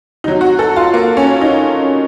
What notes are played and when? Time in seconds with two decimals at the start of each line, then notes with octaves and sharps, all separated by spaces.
0.24 C3 F#3 D#4
0.41 F#4
0.59 A4
0.76 F4
0.94 A#3
1.17 C#4
1.41 D#4